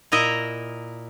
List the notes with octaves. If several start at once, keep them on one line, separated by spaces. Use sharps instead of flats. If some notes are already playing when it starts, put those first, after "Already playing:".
A#2 E4 A#4 D#5 E5 A#5